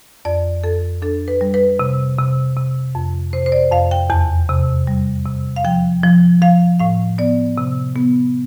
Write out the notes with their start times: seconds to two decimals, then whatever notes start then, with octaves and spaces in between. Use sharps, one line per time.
0.25 F2 D5
0.64 F2 A4
1.02 D4 A4
1.28 B4
1.41 G3
1.54 B4
1.79 C3
2.18 C3
2.56 C3
2.95 F2
3.33 C3 C5
3.46 C5
3.52 D5
3.72 F2 F5
3.91 G5
4.10 E2 A5
4.49 C3
4.87 G3
5.25 C3
5.56 F5
5.65 F3 G5
6.03 F3
6.42 F3 F5
6.79 A2 F5
7.18 B3 D5
7.58 C3
7.96 B3